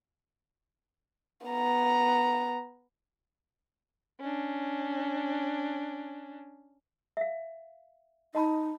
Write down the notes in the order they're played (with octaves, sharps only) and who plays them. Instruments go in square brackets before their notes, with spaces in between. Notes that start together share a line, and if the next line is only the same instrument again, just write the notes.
[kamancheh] B3 A#5
[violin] C#4 D4
[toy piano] E5 F5
[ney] D#4 [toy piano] D#5 A5 B5